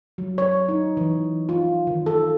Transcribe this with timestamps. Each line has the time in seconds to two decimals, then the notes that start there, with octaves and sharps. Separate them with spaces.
0.18 F#3
0.38 C#5
0.69 D#4
0.97 E3
1.49 F4
1.87 D#3
2.06 A4